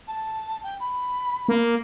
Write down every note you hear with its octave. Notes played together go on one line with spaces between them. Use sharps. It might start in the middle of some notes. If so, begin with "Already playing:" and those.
A5
G5
B5
A#3